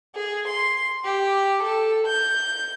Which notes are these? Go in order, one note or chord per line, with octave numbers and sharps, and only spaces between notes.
G#4
C6
G4
A4
G6